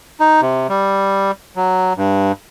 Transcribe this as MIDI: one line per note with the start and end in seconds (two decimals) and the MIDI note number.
0.20 0.41 63
0.41 0.67 48
0.69 1.31 55
1.56 1.93 54
1.97 2.32 43